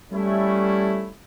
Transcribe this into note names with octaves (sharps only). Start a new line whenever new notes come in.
G3 A3 C#4 E4